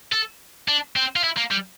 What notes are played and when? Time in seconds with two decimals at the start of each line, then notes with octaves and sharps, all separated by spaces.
0.12 A4
0.68 D4
0.96 C4
1.16 F4
1.24 E4
1.37 A#3
1.51 G3